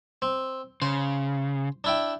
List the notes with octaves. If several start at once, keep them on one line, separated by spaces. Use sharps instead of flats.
C4
C#3 C5
D4 E4 G5